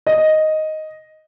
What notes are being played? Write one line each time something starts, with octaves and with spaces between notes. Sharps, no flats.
D#5